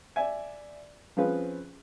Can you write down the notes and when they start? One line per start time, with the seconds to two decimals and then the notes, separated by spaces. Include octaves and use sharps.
0.16 D5 E5 G#5
1.17 F3 C4 C#4 F4 G#4 B4